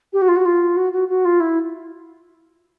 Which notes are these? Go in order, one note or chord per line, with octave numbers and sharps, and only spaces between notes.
G4
F#4
F4
F#4
F4
F#4
F#4
F#4
F4
E4